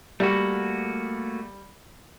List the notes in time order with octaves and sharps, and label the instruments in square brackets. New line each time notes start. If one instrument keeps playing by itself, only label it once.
[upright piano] G3 [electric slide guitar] A3 A#3 F#4